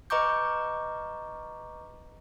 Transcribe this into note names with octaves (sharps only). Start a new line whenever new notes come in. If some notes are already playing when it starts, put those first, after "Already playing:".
B4 D#5 A#5 C#6 D6 G6